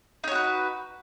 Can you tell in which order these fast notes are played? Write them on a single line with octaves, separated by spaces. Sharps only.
D#4 C#5 F#4 B4